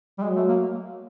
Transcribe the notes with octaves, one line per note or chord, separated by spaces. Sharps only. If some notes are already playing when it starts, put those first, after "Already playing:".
G3
F#3 G#3
A3
A#3